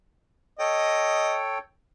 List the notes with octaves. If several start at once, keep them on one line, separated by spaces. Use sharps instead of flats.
A4 C#5 D#5 G5